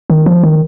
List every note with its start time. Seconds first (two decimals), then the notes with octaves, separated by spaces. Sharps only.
0.10 D#3
0.26 F3
0.43 D#3